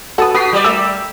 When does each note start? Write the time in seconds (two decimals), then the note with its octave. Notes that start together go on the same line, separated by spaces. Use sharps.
0.18 F#4 A4 B4 A5 D#6
0.35 F#4 B4 D#6 B6 C7
0.53 G3 D5
0.64 A3 A#4 E6